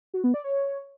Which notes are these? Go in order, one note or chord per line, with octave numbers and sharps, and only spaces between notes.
F#4
B3
D5
C#5